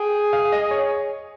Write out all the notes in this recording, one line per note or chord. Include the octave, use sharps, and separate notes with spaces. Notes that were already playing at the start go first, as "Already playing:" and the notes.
Already playing: G#4 G5
F5
D#5
C#5